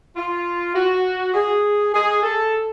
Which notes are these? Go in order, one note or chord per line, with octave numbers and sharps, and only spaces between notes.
F4
F#4
G#4
G#4
A4